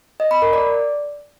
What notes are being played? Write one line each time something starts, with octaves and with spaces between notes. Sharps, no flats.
D#5
B5
A#4
D5